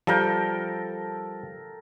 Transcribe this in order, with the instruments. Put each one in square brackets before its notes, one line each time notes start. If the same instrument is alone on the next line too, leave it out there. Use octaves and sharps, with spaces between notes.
[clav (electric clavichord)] F3 G3 [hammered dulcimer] A4 A#4 G5